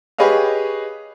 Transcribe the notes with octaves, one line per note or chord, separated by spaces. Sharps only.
G4 G#4 B4 C#5 D#5 F5